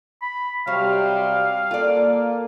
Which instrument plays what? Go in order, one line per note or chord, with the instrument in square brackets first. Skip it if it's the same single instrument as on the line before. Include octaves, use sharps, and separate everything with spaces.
[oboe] B5
[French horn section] C3 G3 [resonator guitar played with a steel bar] F#3 [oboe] F5
[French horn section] A#3 A4 [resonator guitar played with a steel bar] F4 D5